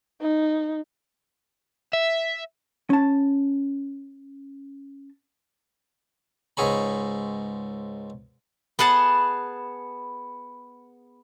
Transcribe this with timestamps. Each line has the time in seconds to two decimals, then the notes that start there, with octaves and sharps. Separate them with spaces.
0.21 D#4
1.93 E5
2.90 C#4 A5
6.57 C#2 G#2 G#4 C#5 B5
8.79 B3 G#4 F#5 A5